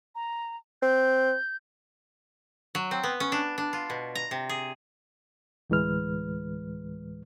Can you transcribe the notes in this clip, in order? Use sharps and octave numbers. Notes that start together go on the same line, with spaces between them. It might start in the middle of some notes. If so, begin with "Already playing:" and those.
A#5
C4 G6
F#3
C4
B3
C#4
D4
D4
F4
B2
A#5
C3
G#4
D2 A2 E3 G#3 B4 F6